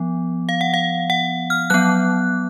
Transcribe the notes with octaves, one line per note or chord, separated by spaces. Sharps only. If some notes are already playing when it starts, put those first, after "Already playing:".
Already playing: F3 B3
F5
F#5
F5
F#5
F6
F#3 B3 F#6